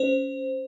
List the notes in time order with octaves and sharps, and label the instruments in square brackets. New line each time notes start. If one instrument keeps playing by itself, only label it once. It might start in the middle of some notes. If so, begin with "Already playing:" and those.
Already playing: [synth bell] C#4 C5